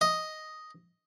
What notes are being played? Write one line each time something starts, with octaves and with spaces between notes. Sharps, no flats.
D#5